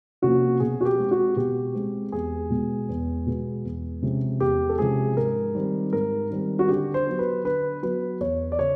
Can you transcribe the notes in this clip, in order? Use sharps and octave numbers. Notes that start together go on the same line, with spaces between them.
C3 F3 A#3 C#4 F#4
B2 G#4
F#4
G4
G#3 C4
F#4
B2 G4
G#3 C4
E2 G#4
B2 G#3 B3
E2
B2 G#3 B3
E2
C3 F3 G#3 C#4
E2 G4
A4
C3 F3 G#3 C#4 G#4
G#2 A#4
D#3 G3 C4
G#2 A#4
D#3 G3 C4
F#4
D3 G4
C5
F#3 B3
B4
D3 B4
F#3 B3 B4
E2 C#5
D5
C#3 C#5